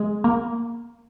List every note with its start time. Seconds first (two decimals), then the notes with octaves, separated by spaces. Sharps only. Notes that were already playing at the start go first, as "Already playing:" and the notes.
Already playing: G#3
0.24 A#3